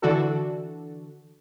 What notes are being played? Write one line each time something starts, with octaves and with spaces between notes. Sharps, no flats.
D3 E3 D4 F#4 A4